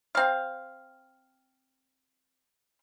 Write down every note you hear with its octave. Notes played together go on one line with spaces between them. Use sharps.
C4 F5